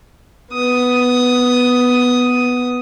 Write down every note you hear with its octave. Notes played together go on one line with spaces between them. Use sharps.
B3 D#6